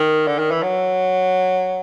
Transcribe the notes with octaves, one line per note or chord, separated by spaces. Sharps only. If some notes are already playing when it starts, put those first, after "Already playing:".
Already playing: D#3
D3
D#3
E3
F#3